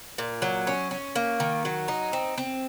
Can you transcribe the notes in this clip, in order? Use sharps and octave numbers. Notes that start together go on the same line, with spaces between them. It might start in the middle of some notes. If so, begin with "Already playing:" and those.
A#2
F#3
C#4
C#4
A#3
D#3
F#3
D#4
C4
C4